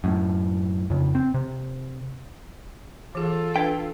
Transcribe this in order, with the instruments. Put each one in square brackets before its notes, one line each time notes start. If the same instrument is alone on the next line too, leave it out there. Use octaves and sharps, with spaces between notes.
[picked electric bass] F#2 A2
F2 C#3
C4
C3
[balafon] E3 G#4 [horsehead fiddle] F4 A4
[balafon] D4 B4 [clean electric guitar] G5